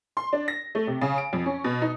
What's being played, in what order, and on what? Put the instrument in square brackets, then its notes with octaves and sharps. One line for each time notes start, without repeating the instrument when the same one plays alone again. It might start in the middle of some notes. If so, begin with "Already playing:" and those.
[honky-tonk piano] C6
D4
A#6
A3
C3
C#3
D7
F2
C#4
B2
D#4